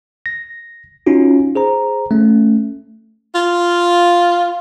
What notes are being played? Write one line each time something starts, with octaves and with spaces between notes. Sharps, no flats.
A#6
C#4 D#4 F4 F#4
G#4 C5 A#5
A3 C#4
F4